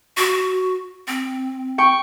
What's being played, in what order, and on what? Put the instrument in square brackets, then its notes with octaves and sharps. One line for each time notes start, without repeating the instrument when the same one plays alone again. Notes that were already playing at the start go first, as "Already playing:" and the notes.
[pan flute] F#4
C4
[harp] G5 C#6